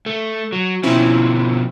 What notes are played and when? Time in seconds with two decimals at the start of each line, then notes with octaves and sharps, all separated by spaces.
0.06 A3
0.53 F#3
0.83 B2 F3 C4 C#4 E4